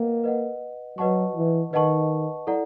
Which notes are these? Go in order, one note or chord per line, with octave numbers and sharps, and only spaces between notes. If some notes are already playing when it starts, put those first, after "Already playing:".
Already playing: A#3 B4 D#5 F#5
B4 D#5 F#5
F#3 B4 D#5 F#5 A5 C#6
E3
D#3 B4 D#5 F#5 A5 C#6
E4 A4 D5 F#5 A#5